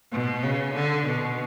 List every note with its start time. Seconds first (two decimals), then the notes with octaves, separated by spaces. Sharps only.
0.12 B2
0.44 C#3
0.75 D3
1.06 B2